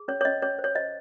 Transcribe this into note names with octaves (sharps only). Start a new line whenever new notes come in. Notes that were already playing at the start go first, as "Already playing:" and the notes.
Already playing: G#4
C#4 C#5
C#5
C#4 D#5
C#4 C#5
C5
C#5
C5 D#5